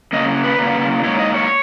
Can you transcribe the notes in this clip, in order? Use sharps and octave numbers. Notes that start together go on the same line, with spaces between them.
C#3 F#3 A#3 D#5
B4
C#3 F#3 A#3
G#2 F#3 A#3 C#5
D#5
C#5